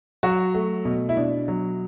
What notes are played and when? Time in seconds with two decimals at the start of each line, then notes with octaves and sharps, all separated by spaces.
0.23 F#3 F#4
0.55 A3
0.85 B2
1.09 E4
1.17 B2 D4
1.48 F#3